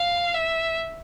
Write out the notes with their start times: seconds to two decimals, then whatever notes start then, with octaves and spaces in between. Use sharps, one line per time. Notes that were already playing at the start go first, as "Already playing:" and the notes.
Already playing: F5
0.34 E5